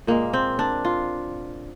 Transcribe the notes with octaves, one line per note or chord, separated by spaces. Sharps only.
A#2 G#3 A#3
C4
D4
F4